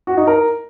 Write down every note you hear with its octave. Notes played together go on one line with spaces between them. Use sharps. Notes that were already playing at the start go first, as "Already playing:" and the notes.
F#4
D#4
A#4